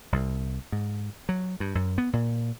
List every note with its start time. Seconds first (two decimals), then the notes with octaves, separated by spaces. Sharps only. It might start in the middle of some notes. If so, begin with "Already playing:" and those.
0.12 C2
0.72 G#2
1.29 F#3
1.60 G2
1.75 F#2
1.98 B3
2.13 A#2